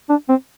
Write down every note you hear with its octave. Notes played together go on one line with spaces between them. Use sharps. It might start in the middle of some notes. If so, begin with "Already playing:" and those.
D4
C4